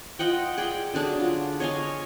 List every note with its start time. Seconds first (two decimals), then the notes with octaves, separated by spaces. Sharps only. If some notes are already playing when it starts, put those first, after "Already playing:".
0.19 F4 D#5 F#5 G5
0.58 G#4 D5 G5
0.94 D3 F#3 D4 G#4
1.20 F4
1.60 C#5 D#5 F5 G#5